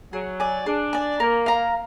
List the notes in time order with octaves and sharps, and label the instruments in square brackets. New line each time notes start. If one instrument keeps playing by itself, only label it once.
[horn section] F#3 [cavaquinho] G#4
[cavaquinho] D5 G#5
[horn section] D4 [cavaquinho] G#4
[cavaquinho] D5 G#5
[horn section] A#3 [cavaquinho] A#4
[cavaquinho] F5 A#5